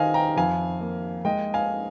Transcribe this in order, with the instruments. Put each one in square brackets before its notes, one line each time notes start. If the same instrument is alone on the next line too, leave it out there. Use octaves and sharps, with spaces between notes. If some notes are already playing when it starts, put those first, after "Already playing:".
Already playing: [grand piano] D#3 C5 D#5 F5 G#5
G5 A#5
F2 F5 G#5
A#3
G#3 D#5 G5
F5 G#5